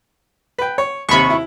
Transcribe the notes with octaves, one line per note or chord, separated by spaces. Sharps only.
B4 G5
C#5
D#2 C3 B5 C#6
E4